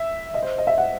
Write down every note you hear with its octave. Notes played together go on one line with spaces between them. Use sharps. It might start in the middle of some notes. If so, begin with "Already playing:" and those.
Already playing: E5
D#5
C5
D#5
E5
F#5